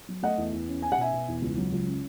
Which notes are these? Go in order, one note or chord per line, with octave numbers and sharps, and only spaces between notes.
F#3
A3 D#5 F#5
E2
E2
C#4
C#4 G#5
F#5
B2 E5 G#5
B2
E2
C#2
F#3
C#2
C#4